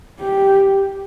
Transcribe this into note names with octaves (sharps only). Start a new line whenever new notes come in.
G4